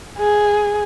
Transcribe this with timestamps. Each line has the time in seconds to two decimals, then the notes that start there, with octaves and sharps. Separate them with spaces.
0.18 G#4